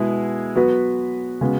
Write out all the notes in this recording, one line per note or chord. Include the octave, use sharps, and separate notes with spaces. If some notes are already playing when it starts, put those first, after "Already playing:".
Already playing: B2 G#3 B3 E4 G#4
F#3 B3 F#4 B4
C#3 G#3 B3 F#4